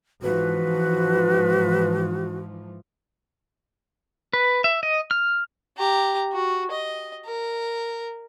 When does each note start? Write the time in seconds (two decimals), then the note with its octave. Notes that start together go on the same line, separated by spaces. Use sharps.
0.22 G#2 E3 F3 F#4 B4
4.33 B4
4.64 E5
4.83 D#5
5.11 F6
5.77 G4 A#5
6.32 F#4
6.71 D#5
7.25 A#4